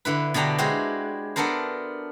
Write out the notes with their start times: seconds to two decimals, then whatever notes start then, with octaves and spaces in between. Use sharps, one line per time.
0.05 D3 E4 B4
0.34 B2 D3 D4 G4 A#5
0.58 G#3 E4 F#4 G4 C5
1.36 B3 D4 A4 A#4 C5